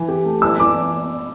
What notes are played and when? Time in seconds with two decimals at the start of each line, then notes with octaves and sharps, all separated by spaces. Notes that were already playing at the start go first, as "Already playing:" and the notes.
Already playing: E3
0.08 G4
0.25 A3
0.42 E3 E6
0.59 E3 D6